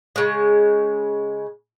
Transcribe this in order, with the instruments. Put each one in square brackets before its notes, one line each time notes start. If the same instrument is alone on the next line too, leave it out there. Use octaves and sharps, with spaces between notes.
[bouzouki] C#3 G#3